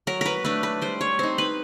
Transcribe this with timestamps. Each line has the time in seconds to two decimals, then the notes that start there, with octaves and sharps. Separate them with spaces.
0.07 F#3 A#4
0.21 A#4 B4
0.44 A3 D4 B4
0.63 B4
0.81 G3 C5
1.01 C#5
1.19 C4 D#4 C5
1.38 B4